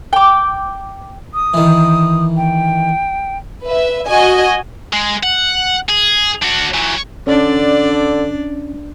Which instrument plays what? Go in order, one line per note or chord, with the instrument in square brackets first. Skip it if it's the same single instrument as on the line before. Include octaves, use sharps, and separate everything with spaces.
[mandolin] G5 D6
[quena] D#6
[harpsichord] D#3 E3
[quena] G5
[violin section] B4 E5
F#4 D#5 G#5
[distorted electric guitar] G#3
F#5
G#4
D4 F#4
E3 F#3
[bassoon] D3 [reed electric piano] C#4 [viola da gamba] D4 D5